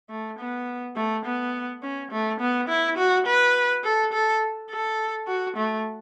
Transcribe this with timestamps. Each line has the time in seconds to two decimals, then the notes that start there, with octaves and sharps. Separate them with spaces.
0.10 A3
0.38 B3
0.96 A3
1.25 B3
1.82 C#4
2.11 A3
2.40 B3
2.68 E4
2.98 F#4
3.26 B4
3.84 A4
4.13 A4
4.70 A4
5.27 F#4
5.56 A3